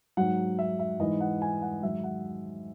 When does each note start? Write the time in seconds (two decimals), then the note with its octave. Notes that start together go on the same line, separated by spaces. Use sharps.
0.17 G#2 F#3 F#5
0.59 E5
0.79 E5
1.00 G#2 E3 D#5
1.20 F#5
1.42 G#5
1.62 F#5
1.83 G#2 D#3 F#3 E5
2.04 F#5